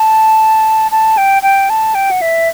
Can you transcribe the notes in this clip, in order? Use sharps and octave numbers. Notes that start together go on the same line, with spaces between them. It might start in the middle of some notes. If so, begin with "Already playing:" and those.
Already playing: A5
A5
G5
G5
A5
G5
F#5
E5